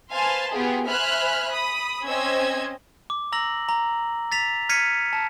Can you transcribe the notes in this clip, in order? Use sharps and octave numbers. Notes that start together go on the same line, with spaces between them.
B4 C5 F5 G#5 A5 C6
B3 F4 G4 G#4
C5 E5 G#5 B5 F6 F#6
B5 D#6
C4 C#4 C5 D#5 E6 G#6
D6
A#5 E6 A#6 F#7
A#5
A6 B6 F7
F6 G#6 B6 C#7 D#7
A5